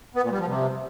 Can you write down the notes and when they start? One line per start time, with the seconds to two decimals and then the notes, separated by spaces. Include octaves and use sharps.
0.15 B3
0.23 A#2
0.31 G3
0.39 F3
0.47 C3